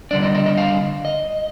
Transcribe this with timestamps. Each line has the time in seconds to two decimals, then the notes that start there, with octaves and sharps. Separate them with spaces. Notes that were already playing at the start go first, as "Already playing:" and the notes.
0.11 D3 G3 D4 D5
0.23 D#5
0.35 D#5
0.46 D#5
0.57 F5
1.05 D#5